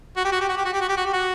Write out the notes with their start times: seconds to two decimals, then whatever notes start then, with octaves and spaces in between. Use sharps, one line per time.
0.17 F#4
0.25 G4
0.32 F#4
0.41 G4
0.49 F#4
0.57 G4
0.65 F#4
0.73 G4
0.81 F#4
0.89 G4
0.97 F#4
1.06 G4
1.13 F#4